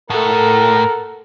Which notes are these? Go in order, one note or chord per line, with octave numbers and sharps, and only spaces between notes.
A2 A4 A#4 F#5